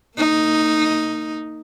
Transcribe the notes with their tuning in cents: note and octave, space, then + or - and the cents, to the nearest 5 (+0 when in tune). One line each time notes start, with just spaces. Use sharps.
A#3 -35 D#4 +0